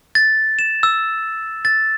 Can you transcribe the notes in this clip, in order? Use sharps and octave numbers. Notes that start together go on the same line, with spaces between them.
A6
E7
E6
A6